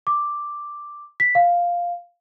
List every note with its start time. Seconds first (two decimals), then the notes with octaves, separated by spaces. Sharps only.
0.07 D6
1.20 B6
1.35 F5